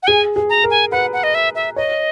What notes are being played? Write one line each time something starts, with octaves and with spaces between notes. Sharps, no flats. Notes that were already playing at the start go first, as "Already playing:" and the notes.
F#5
G#4 G#5
G#4
A#5
A#4
G#5
B4 F#5
F#5
D#5
E5
E5
C#5 D#5